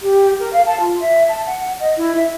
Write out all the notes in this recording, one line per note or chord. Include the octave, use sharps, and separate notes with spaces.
G4
A#4
F5
A5
F4
E5
A5
F#5
D#5
E4
E5